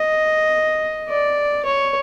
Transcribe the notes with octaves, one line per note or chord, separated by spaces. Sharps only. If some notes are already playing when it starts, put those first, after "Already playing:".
Already playing: D#5
D5
C#5